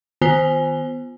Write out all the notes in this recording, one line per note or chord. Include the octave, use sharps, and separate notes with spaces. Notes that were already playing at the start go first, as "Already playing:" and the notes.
D#3 B3 F4 C5 G#5 G7